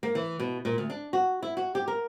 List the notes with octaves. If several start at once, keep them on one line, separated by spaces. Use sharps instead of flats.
A#3
E3
B2
A#2
D2
D4
F#4
E4
F#4
G4
A#4